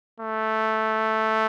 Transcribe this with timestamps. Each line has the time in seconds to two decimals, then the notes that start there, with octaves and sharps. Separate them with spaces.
0.20 A3